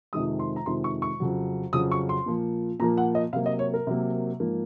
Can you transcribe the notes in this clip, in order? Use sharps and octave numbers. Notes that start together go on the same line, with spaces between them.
F2 C3 D#3 G#3 D#6
C6
A#5
F2 C3 D#3 G#3 C6
C#6
C#6
F2 C#3 F#3
F2 C#3 F#3 D#6
C#6
C6
A#2 F3 A#3
A#2 F3 A#3 A#5
F#5
D#5
C3 F#3 A#3 F5
D#5
C#5
A#4
C3 F#3 A#3
G#2 F3 A#3